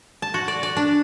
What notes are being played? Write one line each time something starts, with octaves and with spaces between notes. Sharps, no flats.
A5
F#4
D5
D5
D4